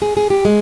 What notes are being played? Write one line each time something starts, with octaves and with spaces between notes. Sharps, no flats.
G#4
G#4
G4
G#3